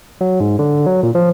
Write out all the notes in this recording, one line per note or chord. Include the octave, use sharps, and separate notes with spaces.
F#3
G#2
D3
F#3
A#2
F3